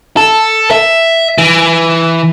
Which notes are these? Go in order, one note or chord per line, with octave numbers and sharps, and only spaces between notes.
A4
E5
E3